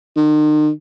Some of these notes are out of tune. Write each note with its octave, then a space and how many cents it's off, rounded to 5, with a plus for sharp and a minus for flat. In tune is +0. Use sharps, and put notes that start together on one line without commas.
D#3 -40